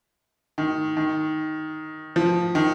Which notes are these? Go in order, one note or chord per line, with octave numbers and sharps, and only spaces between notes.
D#3
D#3
F3
D#3